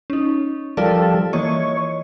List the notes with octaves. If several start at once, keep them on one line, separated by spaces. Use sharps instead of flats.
C#4 D#4
F3 G3 F4 A4 A#4 D5
E3 A#3 C#5 D#5